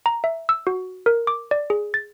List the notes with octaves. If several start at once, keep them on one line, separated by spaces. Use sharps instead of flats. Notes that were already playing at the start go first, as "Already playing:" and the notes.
A#5
E5
E6
F#4
A#4
D6
D5
G#4
A6